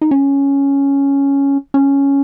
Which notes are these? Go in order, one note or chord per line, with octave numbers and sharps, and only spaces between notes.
D#4
C#4
C#4